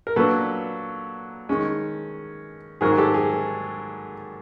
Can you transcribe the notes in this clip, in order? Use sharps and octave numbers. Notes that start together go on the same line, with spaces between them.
A#4
A#2 F#3 B3 D4 A4 B4
D#3 G#3 C#4
G#2 D#3 F#3 G#4 A#4
G4 A4
G#4